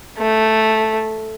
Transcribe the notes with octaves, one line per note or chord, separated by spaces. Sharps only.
A3